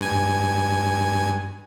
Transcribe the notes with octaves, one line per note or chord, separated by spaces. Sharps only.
G2 G#5